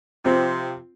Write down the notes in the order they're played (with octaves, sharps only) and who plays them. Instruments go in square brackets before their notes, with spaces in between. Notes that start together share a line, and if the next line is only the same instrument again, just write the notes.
[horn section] C3 F3 [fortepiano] C4 F4